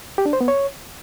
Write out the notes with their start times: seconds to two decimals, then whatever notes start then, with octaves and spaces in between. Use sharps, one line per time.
0.18 G4
0.26 D4
0.33 C5
0.41 B3
0.48 C#5